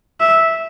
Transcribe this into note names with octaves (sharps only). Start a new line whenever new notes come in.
E5